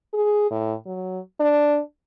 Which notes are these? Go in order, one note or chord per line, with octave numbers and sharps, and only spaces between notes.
G#4
A2
F#3
D4